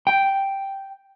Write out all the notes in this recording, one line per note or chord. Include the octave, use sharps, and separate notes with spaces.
G5